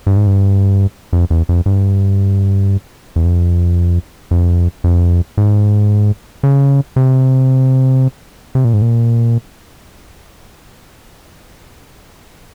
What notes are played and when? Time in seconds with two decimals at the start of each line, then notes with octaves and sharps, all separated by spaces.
0.07 G2
0.17 G#2
0.27 G2
1.13 F2
1.30 E2
1.49 F2
1.66 G2
3.16 E2
3.25 F2
4.31 F2
4.84 F2
5.37 G#2
6.43 C#3
6.96 C3
8.55 C3
8.65 A#2
8.73 G#2
8.82 A#2